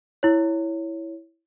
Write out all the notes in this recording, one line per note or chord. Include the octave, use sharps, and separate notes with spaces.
E4 C#5